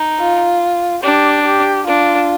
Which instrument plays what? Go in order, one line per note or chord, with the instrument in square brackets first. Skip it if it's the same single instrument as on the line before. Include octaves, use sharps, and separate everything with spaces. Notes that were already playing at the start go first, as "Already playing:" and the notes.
Already playing: [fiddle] D#4
[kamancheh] F4
[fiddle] D4 [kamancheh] G4
[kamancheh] G4
[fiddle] D4 [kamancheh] F4